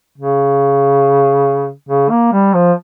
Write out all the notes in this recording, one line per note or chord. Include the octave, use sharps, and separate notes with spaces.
C#3
C#3
A#3
G3
F3